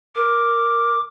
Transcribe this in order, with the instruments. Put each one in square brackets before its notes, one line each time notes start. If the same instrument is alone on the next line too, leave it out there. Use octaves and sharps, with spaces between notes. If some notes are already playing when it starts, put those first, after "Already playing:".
[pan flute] A#4 [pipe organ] D6